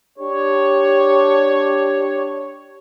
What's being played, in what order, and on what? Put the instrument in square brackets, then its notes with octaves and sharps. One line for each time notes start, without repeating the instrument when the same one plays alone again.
[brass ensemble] D4 G4 C#5